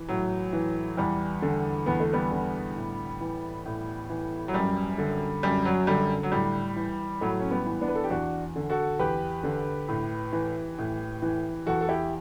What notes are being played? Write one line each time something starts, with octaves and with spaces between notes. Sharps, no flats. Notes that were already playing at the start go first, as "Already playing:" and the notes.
Already playing: E3
A2 F#3
E3
E2 G3
D3
E2 B3
A3
G3 B3
D3
A2
E3
A2
E3
F#3
F#2 G3
D3
F#2 G3
F#3
D3 G3
F#3
A2 G3
E3
A2 F#3 A3
C#4
G3 B3
E3
B3 D4
B4
A4
G4
E2 D4 F#4
D3
F#4 A4
E2 G4 B4
D3
A2
E3
A2
E3
E2 F#4 A4
A4
E4 G4